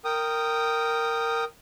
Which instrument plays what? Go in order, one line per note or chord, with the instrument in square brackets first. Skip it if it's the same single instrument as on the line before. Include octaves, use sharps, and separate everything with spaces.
[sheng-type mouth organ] A#4 G5 D#6